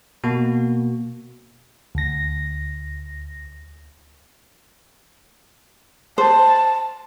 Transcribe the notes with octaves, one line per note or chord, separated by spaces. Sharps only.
B2 A#3 F#4
D2 A#6
C5 A5